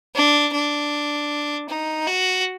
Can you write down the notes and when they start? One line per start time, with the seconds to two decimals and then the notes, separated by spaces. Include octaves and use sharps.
0.15 D4
0.53 D4
1.69 D#4
2.07 F#4